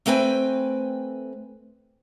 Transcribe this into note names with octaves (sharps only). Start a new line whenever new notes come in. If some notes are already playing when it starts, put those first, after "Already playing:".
A3 C4 B4 G5 G#5